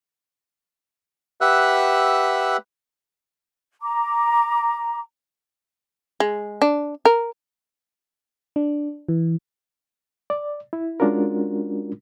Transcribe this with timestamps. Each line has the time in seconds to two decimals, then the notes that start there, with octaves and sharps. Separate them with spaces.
1.41 G4 B4 E5 F#5 E6 F#6
3.81 A#5 D6
6.20 G#3
6.62 D4
7.05 A#4
8.56 D4
9.09 E3
10.30 D5
10.73 E4
11.00 G#3 C#4 D4 F4 F#4 A#4